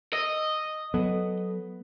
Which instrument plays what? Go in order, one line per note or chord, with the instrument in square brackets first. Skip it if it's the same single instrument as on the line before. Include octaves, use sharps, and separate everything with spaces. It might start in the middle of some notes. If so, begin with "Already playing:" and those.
[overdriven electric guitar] D#5 [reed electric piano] E6
[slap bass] F#3 [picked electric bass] B3 [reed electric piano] A4